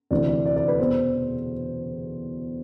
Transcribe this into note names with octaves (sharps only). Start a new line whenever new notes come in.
D2 C3 E3 D5
D5
D5
D5
B4
E2 B2 C5